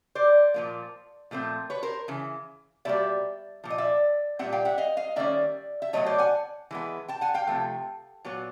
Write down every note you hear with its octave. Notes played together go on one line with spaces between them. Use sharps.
C5 D5
A#2 F3 A#3
A#2 F3 A3 C4
B4 C#5
A#4 C5
C#3 E3
B2 G3 A#3 D5 E5
A#2 F3
D#5
D5 E5
A#2 G3 C4 E5 F#5
F5 G5
E5 F#5
D#5 F5
D#5 F5
D#3 G3 A#3 C#4 D5 E5
E5
B2 F#3 A3 C#5 D#5
C5 D5
F#5 G#5
E3 G#3 B3
G5 A5
F#5 G#5
F5 G5
C3 F3 A3
A#2 F#3 B3